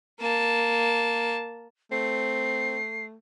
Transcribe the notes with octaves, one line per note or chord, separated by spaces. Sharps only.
A#3 A5
A3 C4 C7